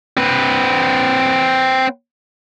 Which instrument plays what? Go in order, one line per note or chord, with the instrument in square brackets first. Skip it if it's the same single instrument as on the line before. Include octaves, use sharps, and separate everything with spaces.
[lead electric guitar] C4 B4